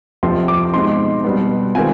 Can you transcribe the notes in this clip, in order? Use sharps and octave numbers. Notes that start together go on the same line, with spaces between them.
F2 C3 F3 C4 C6
D6
B2 G#3 C4 D#4 C6
B2 G3 B3
D#3 G#3 C4 F4 G#5